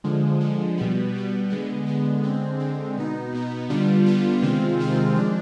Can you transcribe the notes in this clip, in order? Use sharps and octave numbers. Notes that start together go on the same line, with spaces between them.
D3 F3 G#3
D3 F3 G#3
B2 G3 B3
B2 G3 B3
D3 G#3 B3
D3 G#3 B3
D3 G#3 C4
D3 G#3 C4
B2 B3 D#4
B2 B3 D#4
D3 G3 B3 D4 F4
D3 G3 B3 D4 F4
C3 D#3 G#3 C4 F4
C3 D#3 G#3 C4 F4
F3 G#3 D4